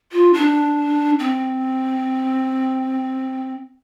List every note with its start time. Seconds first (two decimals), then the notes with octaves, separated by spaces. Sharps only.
0.12 F4
0.33 D4
1.19 C4